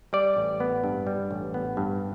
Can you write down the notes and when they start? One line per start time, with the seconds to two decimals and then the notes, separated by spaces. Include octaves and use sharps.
0.13 G3 D5
0.36 A1
0.60 B3
0.84 G2
1.07 G3
1.31 A1
1.54 B3
1.77 G2